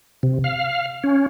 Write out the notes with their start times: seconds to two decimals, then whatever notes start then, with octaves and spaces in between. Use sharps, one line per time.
0.23 C3
0.44 F5
1.04 C#4